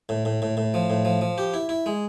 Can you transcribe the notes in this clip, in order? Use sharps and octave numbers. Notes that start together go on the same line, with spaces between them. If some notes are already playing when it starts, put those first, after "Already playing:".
A2
A2
A2
A2
F3
A2
F3
F3
G4
E4
E4
G#3